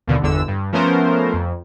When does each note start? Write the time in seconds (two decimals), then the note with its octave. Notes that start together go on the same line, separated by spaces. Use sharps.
0.07 D#2 B2 D3
0.22 G1 E2 D3 E6
0.48 G2
0.72 F3 A3 B3 C#4 A#4 C5
1.34 F2